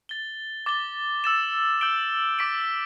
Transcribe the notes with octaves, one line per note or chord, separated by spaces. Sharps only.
A6 G7
D6 A6 G7
E6 A6 E7
E6 G6 D7 G7
D6 B6 D7